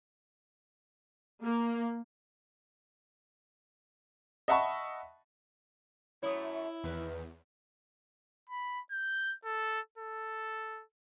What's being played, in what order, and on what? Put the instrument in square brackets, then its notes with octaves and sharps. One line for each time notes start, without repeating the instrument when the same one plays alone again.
[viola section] A#3
[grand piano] D#5 E5 F#5 A5 B5 C#6
[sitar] F#2 A3 [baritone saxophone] E4 [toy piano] C#5 D#6
[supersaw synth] E2 [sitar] D#3 B4
[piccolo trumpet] B5
G6
A4
A4